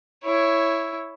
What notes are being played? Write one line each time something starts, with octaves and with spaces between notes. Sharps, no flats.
E4 C#5